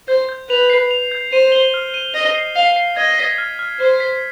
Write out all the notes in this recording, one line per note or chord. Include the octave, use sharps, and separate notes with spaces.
C5 G6
G6
B4 F7
C7
F7
G6
C5 D#7
G7
F6
D#7
D#5 G7
C7
F5 C7
C7
D#5 G#6
B6
F6
F6
C5 F6
B6